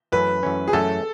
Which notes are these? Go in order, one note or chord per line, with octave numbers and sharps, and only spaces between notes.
F#2 E3 A3 C#4 B4
F#2 E3 A3 C#4
G#4
F#2 E3 A3 C#4 A4